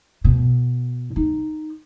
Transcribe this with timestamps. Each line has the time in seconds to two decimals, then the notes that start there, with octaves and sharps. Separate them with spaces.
0.24 B2
1.16 D#4